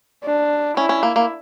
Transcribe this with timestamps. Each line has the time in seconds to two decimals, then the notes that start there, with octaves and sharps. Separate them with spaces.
0.24 D4
0.77 C#4 E4
0.89 C#4
1.03 A#3
1.16 A#3